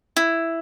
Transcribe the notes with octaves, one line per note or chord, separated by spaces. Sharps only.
E4